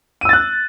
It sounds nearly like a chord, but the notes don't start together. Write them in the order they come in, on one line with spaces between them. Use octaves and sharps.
D#7 E6 A6 F#6